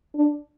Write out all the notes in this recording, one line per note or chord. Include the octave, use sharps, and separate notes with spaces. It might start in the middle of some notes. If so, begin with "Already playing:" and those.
D4